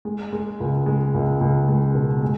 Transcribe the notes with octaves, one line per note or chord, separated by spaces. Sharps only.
G#3
G#3
C#2
G#3
C#2
C#2
G#3
B2
G#3